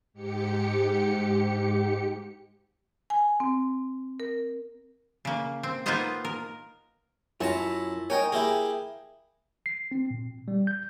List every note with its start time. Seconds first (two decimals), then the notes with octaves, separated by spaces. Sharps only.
0.13 G#2 G4 C#7
3.10 G#5
3.40 C4
4.20 A#4
5.25 C#3 A#3
5.63 C4
5.86 A#3 B3 D#4 F4 C5 D#5
6.25 A#4
7.41 F#2 C#4 E4 F4 A5 A#5
8.10 A#4 C#5 D#5 G5 G#5
8.32 A#3 E4 G4 G#4
9.66 C7
9.91 C4
10.11 A#2
10.48 G3
10.67 G6